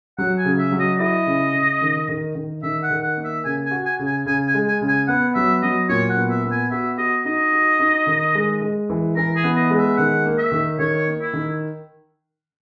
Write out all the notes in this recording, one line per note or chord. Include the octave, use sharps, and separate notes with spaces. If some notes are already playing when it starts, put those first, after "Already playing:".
F#3 F#5
G#5
C#3
E5
F#3
D#5
E4 D#5
C#3
C#3
D#3
D#3
D#3
D#3 E5
F#5
D#3
F#5
A#3
E5
C#3 G#5
G#5
F#4
G#5
C#3
G#5
C#3 G#5
G#5
G#3
G#5
C#3
G#5
B3 F#5
F#3 E5
F#3 D#5
A#2 C#5
F#5
B3
E5
B3
G#5
F#4 E5
F#4 D#5
D#4 D#5
F#4
D#4
D#3
G#3
G#3
E3
E3 A#4
G#4
B3
D#5
G#3
E5
D#3 F#5
A#3
E5
D#3
D#3 C#5
A#3
E4
D#3